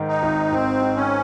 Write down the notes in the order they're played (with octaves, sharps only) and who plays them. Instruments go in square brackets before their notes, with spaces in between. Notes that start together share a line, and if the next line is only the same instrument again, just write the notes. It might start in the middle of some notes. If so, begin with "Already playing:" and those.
Already playing: [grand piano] G#2 D#3
[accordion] D#4
[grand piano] G#1
[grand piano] G#1 [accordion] C4
[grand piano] G#2
[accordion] C#4